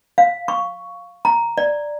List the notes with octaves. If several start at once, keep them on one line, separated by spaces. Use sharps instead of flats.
F5
C#6
A#5
D5